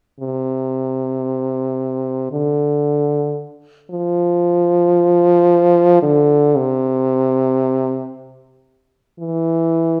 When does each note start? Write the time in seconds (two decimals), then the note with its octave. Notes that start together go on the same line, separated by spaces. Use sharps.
0.20 C3
2.32 D3
3.91 F3
6.03 D3
6.56 C3
9.20 E3